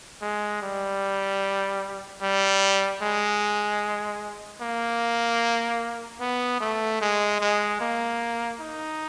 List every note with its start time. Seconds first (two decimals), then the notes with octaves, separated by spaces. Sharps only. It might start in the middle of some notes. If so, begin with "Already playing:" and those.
0.21 G#3
0.62 G3
2.21 G3
3.01 G#3
4.61 A#3
6.20 B3
6.61 A3
7.01 G#3
7.40 G#3
7.81 A#3
8.60 D#4